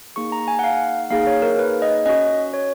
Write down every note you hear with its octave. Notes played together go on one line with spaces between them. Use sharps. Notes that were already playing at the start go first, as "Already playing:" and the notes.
A#3 D#4 G#4 C#6
A#5
G#5
F#5
F5
A#3 D#4 G#4 F5
C#5
A#4
B4
D#5
C#4 F#4 D#5
C#5